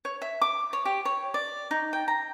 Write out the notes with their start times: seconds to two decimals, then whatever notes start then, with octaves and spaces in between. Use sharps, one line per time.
0.05 C#5
0.22 E5
0.41 D6
0.73 C#5
0.85 G4
1.05 C#5
1.34 D5
1.71 D#4
1.93 G5
2.08 A#5